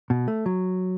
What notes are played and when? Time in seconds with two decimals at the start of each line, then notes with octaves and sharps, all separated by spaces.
0.10 B2
0.28 A3
0.46 F#3